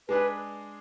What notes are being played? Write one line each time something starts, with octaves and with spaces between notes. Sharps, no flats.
G#3 D4 G#4 B4